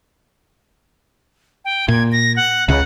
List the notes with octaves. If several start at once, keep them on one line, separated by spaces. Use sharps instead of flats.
G5
A#2 G#6
A#6
F#5
C#2 C#3 F#5